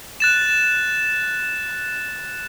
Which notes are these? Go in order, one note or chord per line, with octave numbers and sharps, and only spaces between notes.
F#6 A6 E7